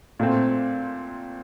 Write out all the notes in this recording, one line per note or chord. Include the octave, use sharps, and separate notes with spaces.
A#2 A3 C4